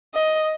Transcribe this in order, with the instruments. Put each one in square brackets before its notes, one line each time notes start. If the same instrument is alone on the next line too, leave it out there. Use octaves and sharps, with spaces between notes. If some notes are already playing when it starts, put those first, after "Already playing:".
[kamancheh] D#5